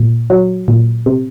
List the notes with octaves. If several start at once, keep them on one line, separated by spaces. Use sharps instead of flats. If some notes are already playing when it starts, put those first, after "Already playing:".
Already playing: A#2
F#3
A#2
C3